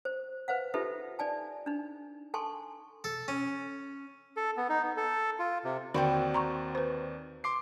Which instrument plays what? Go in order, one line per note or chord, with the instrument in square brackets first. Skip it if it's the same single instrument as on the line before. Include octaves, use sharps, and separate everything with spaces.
[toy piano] C5
B4 C5 F5 F#5
D#4 F4 G4 A4 B4 E5
D#4 D5 G#5 A5
D4 D#4
A4 G#5 A5 C6 C#6
[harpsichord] A4
C#4
[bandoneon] A4
B3
D#4
B3
A4
F4
C3
[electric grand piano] D#2 C4 D5 [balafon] D3 C6 [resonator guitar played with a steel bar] F#4 F#5 G5
[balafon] A#5 C6 C#6
B4 C5
[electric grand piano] C6 D6 C7